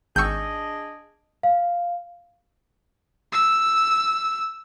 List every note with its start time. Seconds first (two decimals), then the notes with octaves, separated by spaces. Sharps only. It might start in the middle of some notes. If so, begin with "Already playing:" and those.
0.16 G#1 D4 G#4 D#5 C#6 E6 G6
1.43 F5
3.32 E6